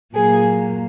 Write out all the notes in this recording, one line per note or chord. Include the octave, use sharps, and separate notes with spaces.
A#2 F#3 A#3 G#4